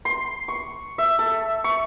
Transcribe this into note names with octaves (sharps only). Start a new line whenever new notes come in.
C6
C#6
E5
A4
C#6